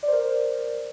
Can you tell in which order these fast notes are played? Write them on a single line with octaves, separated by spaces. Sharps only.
D5 C5 A#4